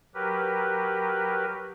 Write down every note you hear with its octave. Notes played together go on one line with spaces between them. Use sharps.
F#3 G4 A#4 B4